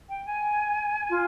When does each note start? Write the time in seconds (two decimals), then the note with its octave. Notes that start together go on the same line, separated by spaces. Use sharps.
0.09 G5
0.27 G#5
1.09 F4